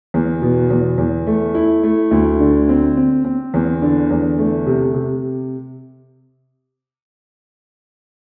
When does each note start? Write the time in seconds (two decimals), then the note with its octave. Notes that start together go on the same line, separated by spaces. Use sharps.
0.14 E2
0.42 B2
0.70 E2
0.98 E2
1.27 A3
1.55 E4
1.83 A3
2.11 D2
2.40 D3
2.69 C4
2.97 C4
3.24 C4
3.54 E2
3.82 D3
4.11 E2
4.39 A3
4.67 C3
4.94 C3